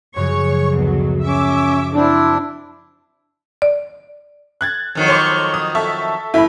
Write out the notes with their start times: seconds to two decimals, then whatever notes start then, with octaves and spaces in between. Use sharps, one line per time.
0.16 F#2 C#3 F3 C#5 C#6
0.76 D2 B2 F#3
1.22 C#4 E5 D6
1.94 C4 D4 E4
3.62 D5
4.61 F#6 G#6 A6
4.95 F2 D#3 F#3
5.08 C#5 C6 D6
5.54 D#6
5.75 A4 E5 C#6
6.34 G1 E4 B5